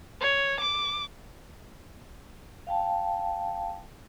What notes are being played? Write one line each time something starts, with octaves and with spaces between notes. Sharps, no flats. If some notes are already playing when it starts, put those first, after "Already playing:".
C#5
D6
F5 G5 A5